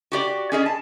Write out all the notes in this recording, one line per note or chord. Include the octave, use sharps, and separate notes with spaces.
F#4 G4 D5
C#4 G#4 D#5
A5